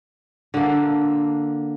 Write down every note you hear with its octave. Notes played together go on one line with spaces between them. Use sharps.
D3 A#3